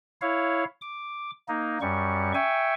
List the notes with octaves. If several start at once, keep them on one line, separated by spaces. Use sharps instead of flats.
E4 C#5 F5
D6
A#3 D#4
F#2 G3 C#6
E5 G5 G#5 C#6